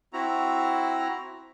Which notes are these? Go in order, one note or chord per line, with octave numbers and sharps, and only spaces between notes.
C4 E4 F#4 A#5